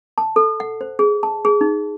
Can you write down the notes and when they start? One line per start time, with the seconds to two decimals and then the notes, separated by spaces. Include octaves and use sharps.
0.18 A5
0.36 A4
0.60 F#5
0.81 C5
0.99 G#4
1.23 A5
1.45 G#4
1.61 D#4